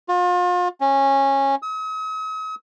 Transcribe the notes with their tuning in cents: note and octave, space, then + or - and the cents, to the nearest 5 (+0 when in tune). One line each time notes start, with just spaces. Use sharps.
F4 +40
C#4 -15
D#6 +45